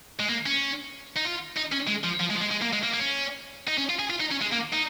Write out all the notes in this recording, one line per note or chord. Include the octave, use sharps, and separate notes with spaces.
G#3
A#3
C#4
D#4
F4
D#4
C#4
G#3
F3
F3
G#3
F3
G#3
G#3
A#3
G#3
A#3
A#3
C#4
D#4
C#4
F4
G#4
F4
D#4
C#4
G#3
A#3
D#4